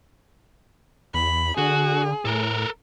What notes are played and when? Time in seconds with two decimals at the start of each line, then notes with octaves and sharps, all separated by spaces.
1.14 E2 B5
1.58 D3 F#4 G#4
2.25 A2 A4 A#4